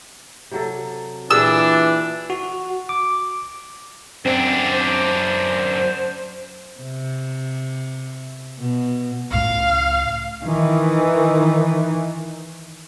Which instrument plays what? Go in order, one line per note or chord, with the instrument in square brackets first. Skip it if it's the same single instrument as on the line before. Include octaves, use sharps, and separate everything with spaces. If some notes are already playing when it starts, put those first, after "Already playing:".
[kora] C3 F#3 A4
[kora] A#2 G4 G#4 [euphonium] E3 [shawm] D4 [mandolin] E6
[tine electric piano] F#4
D6
[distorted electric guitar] F#2 D4 [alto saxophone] C4
[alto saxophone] C5
[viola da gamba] C3
B2
[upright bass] C#2 A2 [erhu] F5
[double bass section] D#3 E3